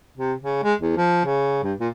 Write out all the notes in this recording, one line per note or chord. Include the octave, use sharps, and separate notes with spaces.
C3
C#3
G#3
E2
F3
C#3
G2
A#2